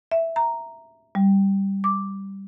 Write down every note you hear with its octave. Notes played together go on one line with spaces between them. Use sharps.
E5
A#5
G3
D6